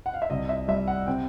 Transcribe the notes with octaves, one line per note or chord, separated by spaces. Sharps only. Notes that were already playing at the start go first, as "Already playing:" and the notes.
F#5
F5
E5
C2 D#5
E5
G3 E5
F#5
C3 G5